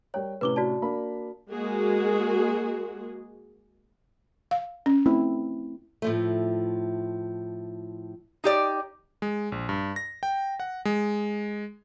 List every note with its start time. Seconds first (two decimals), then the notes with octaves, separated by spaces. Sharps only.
0.14 G3 A#4 C#5 G5
0.41 A2 C3 C#4 B4 D6 G7
0.56 F#4 D5 A5
0.82 A#3 D4 B5
1.51 G#3 A#3 F#4 G#4
4.51 F5
4.86 C#4
5.06 A3 C4 E4
6.02 A2 F3 A3
8.44 D#4 G4 D5
9.22 G#3
9.52 A#1
9.69 G2
9.96 A#6
10.23 G5
10.60 F#5
10.85 G#3